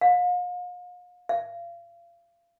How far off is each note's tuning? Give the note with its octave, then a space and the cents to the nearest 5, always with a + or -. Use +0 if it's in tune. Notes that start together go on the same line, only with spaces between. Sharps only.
F5 +40
F5 -30